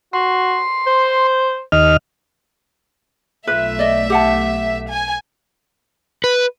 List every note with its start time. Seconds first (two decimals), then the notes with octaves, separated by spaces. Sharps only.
0.13 F#4 C6
0.87 C5
1.72 D#2 D#5 F6
3.47 B1 A3 F4 B4 E5
3.79 D5 D#5
4.10 G4 F#5 A5
4.90 G#5
6.24 B4